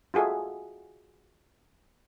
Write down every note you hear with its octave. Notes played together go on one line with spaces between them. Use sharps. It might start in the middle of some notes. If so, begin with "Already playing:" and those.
F4 F#4 G#4 A4 E5